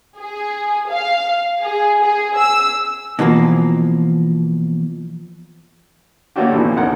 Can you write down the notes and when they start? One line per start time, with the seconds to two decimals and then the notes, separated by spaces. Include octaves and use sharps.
0.17 G#4
0.89 F5
1.60 G#4
2.01 G#4
2.37 E6
3.19 B2 E3 F3 A#3
6.36 A3 A#3 C#4 D4 F#4 G4
6.52 A1 D#2 B2 E3
6.76 G#1 D2 A#4 F#5